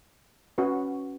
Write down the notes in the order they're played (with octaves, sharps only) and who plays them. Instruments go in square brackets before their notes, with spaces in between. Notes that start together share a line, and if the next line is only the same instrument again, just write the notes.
[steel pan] C#4 F#4 B4